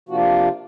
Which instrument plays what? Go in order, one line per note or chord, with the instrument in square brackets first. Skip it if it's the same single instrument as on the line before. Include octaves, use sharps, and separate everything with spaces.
[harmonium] C3 F3 A#3 D4 F4 F#4